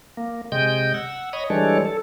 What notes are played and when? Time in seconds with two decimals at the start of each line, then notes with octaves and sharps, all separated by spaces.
0.17 A#3
0.52 C3 G#3 D#5 G5 G6
0.94 F#5 E6
1.33 C#5 D#5 B5 C#6 D#6
1.50 E3 G3 G#3 D4 A4 C#5
1.85 A4